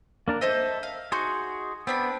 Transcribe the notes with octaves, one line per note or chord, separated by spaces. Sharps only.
A#3 D4 A#4
A4 C5 D#5 E5
F5
D#4 F#4 G#4 C6
B3 C4 D4 B5